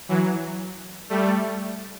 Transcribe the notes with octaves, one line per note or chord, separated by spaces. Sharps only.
E3 F#3
G3 A3